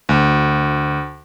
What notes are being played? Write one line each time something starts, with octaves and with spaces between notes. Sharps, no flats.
D2